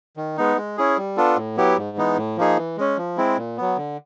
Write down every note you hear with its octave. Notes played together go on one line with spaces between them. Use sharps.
D#3
G#3 B3 D#4
G#3
C#4 E4 G#4
G3
B3 D4 F4 A4
A2
F#3 B3 E4 G4
G#2
E3 G#3 B3 D#4
A2
F3 A#3 D#4 G#4
E3
G#3 C#4
F3
G#3 C4 E4
A#2
F#3 B3
D3